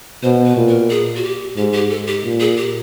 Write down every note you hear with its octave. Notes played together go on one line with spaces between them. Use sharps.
B2 C5
B4
A#2
A#4
G#4
F#4
G4
G#2 G4
G4
A4
G4
A#2
G#4
G4